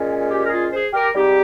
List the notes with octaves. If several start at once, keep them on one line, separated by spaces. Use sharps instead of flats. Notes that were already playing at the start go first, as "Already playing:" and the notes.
Already playing: A#2 G#3 C#4
G4
A#4
F4 G#4
G#4 C5
G4 A#4
G#2 G3 C4 D#4 G4